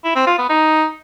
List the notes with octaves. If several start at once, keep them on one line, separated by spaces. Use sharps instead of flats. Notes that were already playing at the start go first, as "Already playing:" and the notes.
E4
C4
F4
B3
D#4